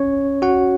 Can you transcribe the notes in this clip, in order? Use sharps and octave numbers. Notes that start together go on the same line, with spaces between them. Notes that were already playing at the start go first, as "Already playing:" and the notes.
Already playing: C#4 C#5
F#4 F#5